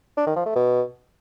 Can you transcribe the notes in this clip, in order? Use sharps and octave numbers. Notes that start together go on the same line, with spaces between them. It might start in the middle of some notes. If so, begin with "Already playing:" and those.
D4
D#3
F3
A3
B2